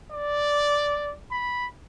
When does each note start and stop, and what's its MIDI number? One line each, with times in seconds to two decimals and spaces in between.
0.12 1.14 74
1.31 1.67 83